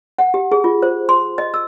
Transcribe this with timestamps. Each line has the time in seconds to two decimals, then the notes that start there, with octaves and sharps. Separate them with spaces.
0.18 F#5
0.34 G4
0.52 G#4
0.64 F4
0.82 C5
1.09 C6
1.38 D#5
1.54 E6